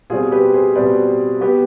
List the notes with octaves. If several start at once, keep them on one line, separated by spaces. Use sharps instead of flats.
B2 G3 C4 F4 G#4
G4 B4
G#4 C5
B2 G3 C4 B4 D5
G3 B3 G4 B4